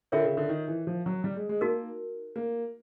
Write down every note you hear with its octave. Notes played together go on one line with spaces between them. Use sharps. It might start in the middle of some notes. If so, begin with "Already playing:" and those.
D3 F4 A#4 C#5 E5 G5
C#3
D3
D#3
E3
F3
F#3
G3
G#3
G#3
A#3 D#4 F#4 A#4
A#3